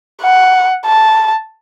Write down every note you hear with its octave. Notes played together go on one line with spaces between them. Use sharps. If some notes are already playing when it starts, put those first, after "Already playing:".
F#5
A5